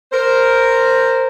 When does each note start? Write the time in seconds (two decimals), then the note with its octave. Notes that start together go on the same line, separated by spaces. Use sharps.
0.13 A#4 C5